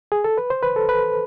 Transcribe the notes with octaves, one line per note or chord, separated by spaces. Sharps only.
G#4
A4
B4
C5
B4
A4
B4